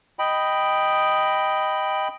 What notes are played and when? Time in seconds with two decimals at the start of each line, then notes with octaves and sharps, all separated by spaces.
0.19 D#5 G5 B5